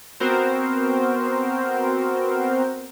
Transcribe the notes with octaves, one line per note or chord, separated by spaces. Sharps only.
B3 C4 F#4 A#4 C5